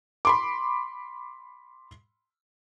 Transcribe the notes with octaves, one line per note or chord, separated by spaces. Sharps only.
B5 C6 D6